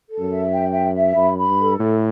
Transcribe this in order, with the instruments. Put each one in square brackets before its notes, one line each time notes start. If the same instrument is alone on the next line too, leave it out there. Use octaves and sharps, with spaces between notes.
[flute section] A4
[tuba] F#2
[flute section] E5
G5
E5
E5
[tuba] F#2 [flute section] B5
[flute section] B5
[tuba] G2
[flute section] A4
[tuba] A2 [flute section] E4